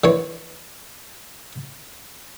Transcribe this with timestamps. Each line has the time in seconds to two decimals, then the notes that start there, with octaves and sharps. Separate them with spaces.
0.04 D3 E3 C#5